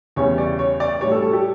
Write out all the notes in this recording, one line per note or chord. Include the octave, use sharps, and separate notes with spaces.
E2 C#3 G3 C#5
D5
C#5
D5
A2 G3 C#5
A4
A4
G4